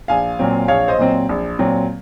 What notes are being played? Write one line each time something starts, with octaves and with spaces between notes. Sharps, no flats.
A#1 F5 G#5
A#2 F#3 C4
A#1 C#5 F5
C5 D#5
A#2 F#3 C4
A#1
A#2 F#3 C4